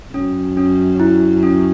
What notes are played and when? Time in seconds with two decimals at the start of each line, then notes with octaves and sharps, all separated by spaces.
0.14 F#2 C#4
0.57 C#4
1.00 E4
1.43 C#4